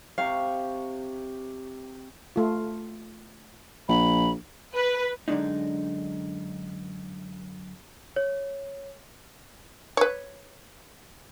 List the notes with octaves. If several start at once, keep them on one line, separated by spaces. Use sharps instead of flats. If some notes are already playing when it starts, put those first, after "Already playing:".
C3 G4 F5 C#6
A3 F4
A#1 B5
B4
F#2 D3 D#3 G#3 D4 D#4
C#5
B4 C#5